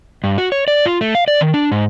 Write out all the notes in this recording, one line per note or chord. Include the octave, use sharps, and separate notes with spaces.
G2
F#4
C#5
D5
F4
A3
F5
D5
D#3
D4
G#2